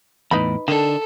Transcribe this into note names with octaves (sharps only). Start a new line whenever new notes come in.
E2 A2 D#4 B4 B5
D3 D#3 D4 A4